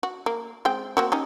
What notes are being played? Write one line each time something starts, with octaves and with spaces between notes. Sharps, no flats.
F#4
A#3
G#3 C4 G5
A#3 C4 F#4
C#4 D#4 G4